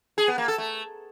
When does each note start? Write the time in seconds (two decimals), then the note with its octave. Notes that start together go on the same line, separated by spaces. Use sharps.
0.18 G#4
0.28 B3
0.38 A#3
0.48 A4
0.58 A3